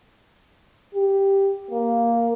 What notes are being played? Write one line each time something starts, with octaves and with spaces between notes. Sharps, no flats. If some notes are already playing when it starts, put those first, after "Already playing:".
G4
A#3